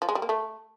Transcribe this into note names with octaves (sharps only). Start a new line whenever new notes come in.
F3
G#3
G3
A#3
A3